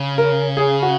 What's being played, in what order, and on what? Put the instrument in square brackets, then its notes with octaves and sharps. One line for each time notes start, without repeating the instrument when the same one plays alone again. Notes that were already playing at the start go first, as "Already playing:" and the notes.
Already playing: [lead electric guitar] C#3
[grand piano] A#4
G#4
F#4